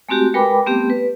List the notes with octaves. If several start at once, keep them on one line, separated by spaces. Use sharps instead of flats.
G#3 A3 C4 F#4 G4
G#3 A#4 B4 G5 B5 D6
G3 A3 B3 C4 G4
B4